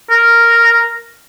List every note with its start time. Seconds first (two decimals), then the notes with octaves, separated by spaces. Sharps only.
0.11 A#4